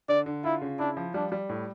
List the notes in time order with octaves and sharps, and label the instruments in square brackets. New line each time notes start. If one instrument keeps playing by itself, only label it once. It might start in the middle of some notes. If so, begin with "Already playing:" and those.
[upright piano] D3 [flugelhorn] D5
[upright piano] D3
[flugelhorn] E4 [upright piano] F4
[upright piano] C#3
[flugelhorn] D4 [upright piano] E4
[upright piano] F3
[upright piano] G3 [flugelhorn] D4
[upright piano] G3
A2